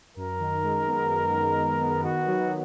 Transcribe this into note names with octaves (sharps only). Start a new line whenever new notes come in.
F#2 A#4
D#3
G#3
B3
F#2
D#3
G#3
B3
D#3 F#4
F#3